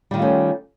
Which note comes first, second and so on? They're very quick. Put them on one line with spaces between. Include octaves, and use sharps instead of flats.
G3 D#3 F4 A3 C#4